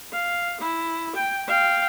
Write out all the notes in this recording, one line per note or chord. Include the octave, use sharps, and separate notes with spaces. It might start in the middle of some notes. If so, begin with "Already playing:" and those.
F5
E4
G5
F5 G5